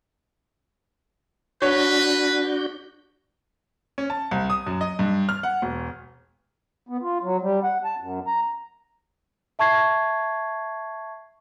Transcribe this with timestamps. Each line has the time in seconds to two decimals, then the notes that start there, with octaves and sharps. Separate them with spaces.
1.62 D4 F#4 B4 C#5 G6
3.98 C#4
4.10 A5
4.31 C2
4.50 D#6
4.67 F#2
4.81 D#5
4.99 G2
5.29 F6
5.43 F#5
5.62 E1
6.89 B3
7.02 F4
7.23 F#3
7.42 G3
7.63 F#5
7.85 A5
8.00 F#2
8.27 A#5
9.59 E5 A5 C#6 G#6 C7